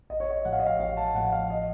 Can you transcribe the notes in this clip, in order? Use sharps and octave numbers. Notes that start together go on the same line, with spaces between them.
A1 D#5
C#5
D#5
A2 F3 A3 F#5
F5
D#5
F5
A1 F5
A5
A2 F3 A3 F#5
F5
D#5